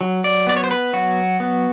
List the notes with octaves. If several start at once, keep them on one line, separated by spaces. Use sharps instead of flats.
F#3
D5
B3 D5
C#5
C5
B4
F#3 F#4
B3